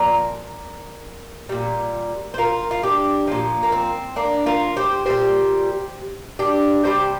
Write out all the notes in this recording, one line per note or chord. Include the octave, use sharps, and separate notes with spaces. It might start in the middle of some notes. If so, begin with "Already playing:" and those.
Already playing: A#2 F3 A#4 D5
A#2 G3
C5
F4 A#4
F4
D4 G4
A#2 F3
A#3
C4
A#3 D4
F4 A#4
G4 C5
A#2 G3 G4 C5
D4 G4
C3 G3 G4 C5